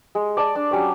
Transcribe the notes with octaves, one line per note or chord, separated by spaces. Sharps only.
G#3
D5 A5
D4
F#3 C#4 G4 C#5